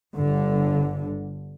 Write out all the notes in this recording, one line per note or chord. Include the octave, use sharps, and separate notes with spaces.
G1 D3